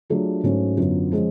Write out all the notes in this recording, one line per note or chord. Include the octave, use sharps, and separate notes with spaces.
F#3 A3 D4 F4 G#4
G#2 F#3 A3 C#4
F#2 D3 F#3 B3 F4
F3 G#3 C#4 G#4